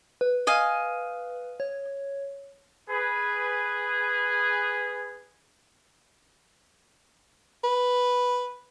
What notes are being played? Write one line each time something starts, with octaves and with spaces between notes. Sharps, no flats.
B4
D#5 F5 G#5
C#5
G#4 B4
B4